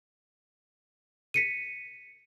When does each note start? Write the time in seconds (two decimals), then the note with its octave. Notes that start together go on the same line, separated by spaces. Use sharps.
1.34 B6 C#7 D#7